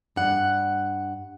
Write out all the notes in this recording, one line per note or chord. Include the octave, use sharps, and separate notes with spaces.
G2 F#5